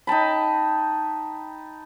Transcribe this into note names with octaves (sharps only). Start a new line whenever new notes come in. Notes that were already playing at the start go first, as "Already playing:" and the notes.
D#4 G5 A5 B5